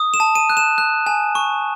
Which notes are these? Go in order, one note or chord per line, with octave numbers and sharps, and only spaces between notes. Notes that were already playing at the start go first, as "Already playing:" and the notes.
Already playing: D#6
E7
A5
D#7
F#6
E7
F#6
G#5
C#6